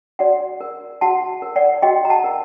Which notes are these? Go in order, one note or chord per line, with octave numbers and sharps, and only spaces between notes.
F#4 D5 F#5
A#4
F#4 F#5 A5
A#4
D5 F#5
F#4 D#5 G5
A#5
F#5 A5
A#4